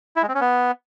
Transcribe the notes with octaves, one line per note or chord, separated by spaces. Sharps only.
E4
G#3
C4
C#4
B3